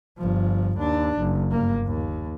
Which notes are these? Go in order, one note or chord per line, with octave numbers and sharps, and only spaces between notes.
G1 F3
D#2 D4
F#1
G1 A#3
D#2